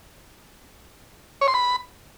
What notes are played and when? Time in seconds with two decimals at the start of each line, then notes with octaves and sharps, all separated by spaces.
1.41 C#5
1.48 C6
1.54 B5